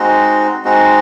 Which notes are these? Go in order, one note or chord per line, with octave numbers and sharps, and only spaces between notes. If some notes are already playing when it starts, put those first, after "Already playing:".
Already playing: G#3 C4 D#4 F#4
G#3 C4 D#4 F#4